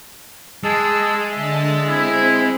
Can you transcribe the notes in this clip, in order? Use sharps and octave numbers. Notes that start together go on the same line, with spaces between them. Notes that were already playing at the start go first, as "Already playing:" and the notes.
G#3 G#4 A5 E6
D3 E5 A5
C4 E4